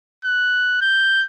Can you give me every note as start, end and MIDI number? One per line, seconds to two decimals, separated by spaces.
0.25 0.77 90
0.82 1.25 91